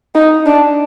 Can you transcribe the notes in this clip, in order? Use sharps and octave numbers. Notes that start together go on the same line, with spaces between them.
D#4
D4